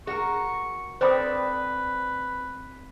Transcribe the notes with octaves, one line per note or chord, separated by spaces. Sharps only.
F#4 G#4 A#4 C#6
C4 A4 B4 C5 D5 B5 D#6